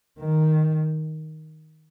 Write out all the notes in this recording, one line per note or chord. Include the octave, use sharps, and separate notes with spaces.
D#3